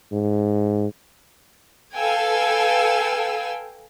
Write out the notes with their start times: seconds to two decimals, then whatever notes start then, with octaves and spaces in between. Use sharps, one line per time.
0.12 G#2
1.96 A4 B4 F5 G5 G#5 E6